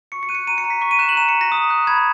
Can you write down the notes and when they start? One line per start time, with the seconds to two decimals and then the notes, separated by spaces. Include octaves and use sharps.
0.12 C#6 C#7
0.23 C#7
0.29 F#6 D#7
0.35 C#7
0.47 A#5 D#7
0.58 C#7
0.64 A#5
0.70 B6
0.81 C#6 B6
0.91 D#7
0.99 F#6 E7
1.09 F#7
1.17 A#5 E7
1.29 C#7
1.35 A#5
1.41 A#6
1.52 D#6
1.70 F#6
1.87 B5 G#6